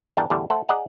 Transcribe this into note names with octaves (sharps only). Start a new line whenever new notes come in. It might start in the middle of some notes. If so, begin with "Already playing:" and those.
E2 G2 D4 A#4 G5 A5
E2 A2 D3 G3 D4
A3 A4 C5 F#5
G#4 D5 D#5 F#5 A#5